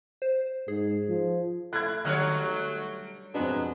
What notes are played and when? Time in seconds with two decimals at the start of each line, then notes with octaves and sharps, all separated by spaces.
0.22 C5
0.68 G#2 G#4
1.09 F3
1.73 A3 E4 F#6 G#6
2.05 D3 F#3 G3 C#5 F6 F#6
3.34 F2 B2 F#3 G#3 B3 D4